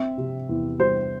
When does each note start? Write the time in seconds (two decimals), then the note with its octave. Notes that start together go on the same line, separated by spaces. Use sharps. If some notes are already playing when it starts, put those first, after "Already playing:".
Already playing: C4 E5
0.18 C3
0.49 E2
0.79 G3 C5